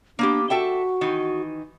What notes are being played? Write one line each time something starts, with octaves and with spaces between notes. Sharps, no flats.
A#3 B3 D4 G4
F#4 A4 E5 G5
D#3 E3 D#4